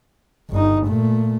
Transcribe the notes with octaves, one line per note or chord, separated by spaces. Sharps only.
G1 D#4
A#2 A3